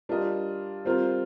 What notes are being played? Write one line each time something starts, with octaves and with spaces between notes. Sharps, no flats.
G3 D4 F4 A#4 D#5
G3 C4 F4 A#4